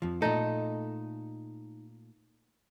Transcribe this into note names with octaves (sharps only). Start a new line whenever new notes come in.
F2 F3
A#2 A3 D#4 A4